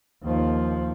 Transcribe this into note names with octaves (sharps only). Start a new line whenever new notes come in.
D#2 F3